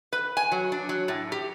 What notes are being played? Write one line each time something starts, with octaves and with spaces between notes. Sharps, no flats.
B4
G#5
F#3
D4
F#3
A2
G4